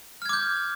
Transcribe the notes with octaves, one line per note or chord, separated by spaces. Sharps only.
D6 F6 G6 G#6